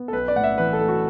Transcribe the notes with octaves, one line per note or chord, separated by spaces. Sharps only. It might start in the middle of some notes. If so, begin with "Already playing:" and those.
Already playing: B3
A4
B1 B4
D5
A2 F#5
E5
E3 B4
A4
A3
F#4